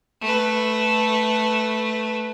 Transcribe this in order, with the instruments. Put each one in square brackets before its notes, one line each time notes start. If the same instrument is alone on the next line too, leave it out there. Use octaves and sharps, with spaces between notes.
[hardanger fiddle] A3 B4